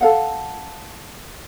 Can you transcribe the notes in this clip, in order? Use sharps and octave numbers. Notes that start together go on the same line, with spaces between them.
A4 F5 F#5